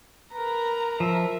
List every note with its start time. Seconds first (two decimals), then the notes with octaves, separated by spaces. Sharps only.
0.33 A#4 B4 A#5
1.00 F3 A#4 E5